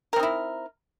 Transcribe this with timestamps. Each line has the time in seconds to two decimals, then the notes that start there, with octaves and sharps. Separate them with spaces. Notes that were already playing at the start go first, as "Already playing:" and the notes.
0.13 A#4
0.16 C4
0.20 D#4
0.23 E4